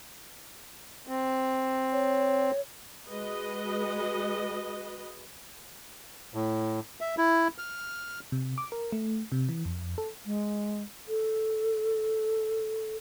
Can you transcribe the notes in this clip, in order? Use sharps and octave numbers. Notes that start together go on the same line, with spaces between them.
C4
C#5
G#3 F#4 B4 D#5
A2
E5
E4
F6
C3
D6
A#4
A3
C3
E3
F2
A4
G#3
A4